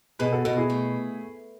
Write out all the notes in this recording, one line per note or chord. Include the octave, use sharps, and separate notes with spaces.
B2 G#4 B4
F#4 A4
B2 F#4 A4
E4 G#4
A3